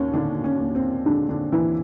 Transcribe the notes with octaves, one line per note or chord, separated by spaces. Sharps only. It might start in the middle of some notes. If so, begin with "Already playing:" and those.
Already playing: D#2 C#4
D3 D#3 D4
C#4
D#2
C4
D3 G#3 D4
D3 D4
D#2 E3 E4